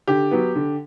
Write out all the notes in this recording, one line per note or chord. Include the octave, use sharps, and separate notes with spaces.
D3 G4
F#3 B3
D3